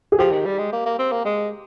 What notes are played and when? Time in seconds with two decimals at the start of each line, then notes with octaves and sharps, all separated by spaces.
0.12 G#4
0.19 F3 G4
0.32 D#3
0.46 G3
0.59 G#3
0.73 A#3
0.86 A#3
0.99 C4
1.12 A#3
1.25 G#3